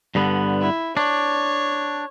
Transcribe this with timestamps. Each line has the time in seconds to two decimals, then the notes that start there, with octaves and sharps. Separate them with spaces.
0.15 G2 D3 B3
0.61 E4
0.97 D4 C#5